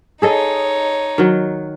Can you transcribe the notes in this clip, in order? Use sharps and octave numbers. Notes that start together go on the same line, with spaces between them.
D#4 G#4 A4 C#5 D#5
D#3 F#3